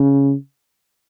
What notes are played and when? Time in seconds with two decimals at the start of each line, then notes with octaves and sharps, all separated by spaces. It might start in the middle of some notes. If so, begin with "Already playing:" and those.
Already playing: C#3